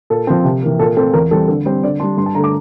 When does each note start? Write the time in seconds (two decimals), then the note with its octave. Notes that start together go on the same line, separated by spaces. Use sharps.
0.10 A#2 A4
0.27 F3 C4
0.44 C3
0.62 E3 A#3
0.79 A#2 A4
0.96 A3 C4 A4
1.14 E2 A#4
1.31 E3 G3 C4 A4
1.48 D3 A4
1.65 G3 C4 C5
1.83 D3 D5
2.00 G3 D4 C6
2.17 G2 C6
2.26 A5
2.34 D3 A#5
2.38 A3
2.44 D6